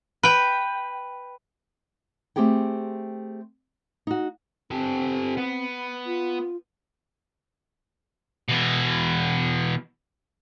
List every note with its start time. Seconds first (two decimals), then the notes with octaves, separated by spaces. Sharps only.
0.23 B4 G5
2.36 A3 C4 G4 G#4 G5
4.07 D#4 F#4
4.71 C4 G4 A4
5.37 B3
6.06 F4
8.48 B2 E3